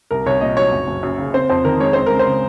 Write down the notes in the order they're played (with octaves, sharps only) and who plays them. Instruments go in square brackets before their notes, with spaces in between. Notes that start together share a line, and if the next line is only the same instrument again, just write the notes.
[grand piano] C2 A#4
C2 C#5
A#2 D#5
F#3 C#5
F#1
F#1
F#2
C#3
C4 C5
F2 C5
D#3 A#4
G#3 C#5
C4 C5
C#2 A#4
C5
C#3